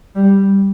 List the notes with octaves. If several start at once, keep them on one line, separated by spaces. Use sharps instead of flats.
G3